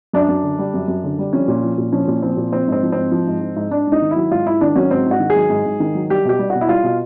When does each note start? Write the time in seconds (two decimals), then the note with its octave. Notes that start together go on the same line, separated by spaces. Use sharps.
0.13 F#2 D4
0.28 F#2
0.44 D3
0.59 G3
0.74 F#2
0.88 F#2
1.04 D3
1.19 G3
1.33 F3 C#4
1.48 A#2
1.64 F3
1.78 A#2
1.92 F3 C#4
2.08 A#2
2.22 F3 C4
2.37 A#2
2.52 F3 C4
2.68 G#2 C4
2.83 F3
2.92 G#2 C4
3.11 F3
3.27 G#2
3.41 F3
3.56 G#2
3.71 G#2 D4
3.87 G#2 D#4
4.02 D#3
4.11 E4
4.16 F#3
4.31 G#2 F4
4.46 G#2 E4
4.61 D#3 D4
4.75 F#3 C#4
4.91 G#2 C4
5.06 G#2 F#4
5.20 D#3
5.30 G#4
5.36 F#3
5.50 G#2
5.66 G#2
5.80 D#3
5.95 F#3
6.10 G3 G4
6.25 B2 G4
6.39 G3
6.50 B2 F#4
6.61 E4
6.69 G3 F4
6.84 B2